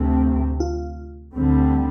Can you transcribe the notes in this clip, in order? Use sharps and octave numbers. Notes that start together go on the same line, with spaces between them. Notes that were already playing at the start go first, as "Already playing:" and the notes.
Already playing: D2 C3 A3 C4
F4
D2 D3 G3 C4